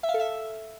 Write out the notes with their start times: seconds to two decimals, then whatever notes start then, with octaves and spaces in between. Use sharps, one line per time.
0.03 E5
0.09 F5
0.14 A4
0.20 E5